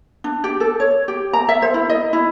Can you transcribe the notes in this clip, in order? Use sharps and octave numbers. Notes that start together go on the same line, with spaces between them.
D4
G4
A4
C#5
G4
A#5
E5
C5
E4
D#5
E4